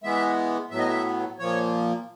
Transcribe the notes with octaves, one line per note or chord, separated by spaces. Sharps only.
E3 G#3 B3 E5
A2 F#3 B3 E5
D#5
E5
A#2 F3 A#3 C#5